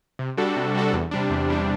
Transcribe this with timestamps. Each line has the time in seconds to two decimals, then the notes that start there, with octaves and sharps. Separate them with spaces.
0.19 C3
0.37 G3 D4 F#4 A4
0.56 C3
0.75 G3 D4 F#4 A4
0.93 E2
1.11 C3 G3 D4
1.30 E2
1.49 C3 G3 D4